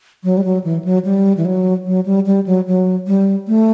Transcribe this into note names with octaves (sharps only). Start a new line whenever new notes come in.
F#3
G3
F#3
E3
F#3
G3
E3
F#3
F#3
G3
G3
F#3
F#3
G3
A3